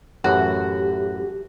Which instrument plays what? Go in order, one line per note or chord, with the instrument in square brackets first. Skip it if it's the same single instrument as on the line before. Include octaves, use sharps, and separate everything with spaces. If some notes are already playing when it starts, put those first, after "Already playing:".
[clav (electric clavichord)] F#2 A2 E3 [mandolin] F#4 [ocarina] G4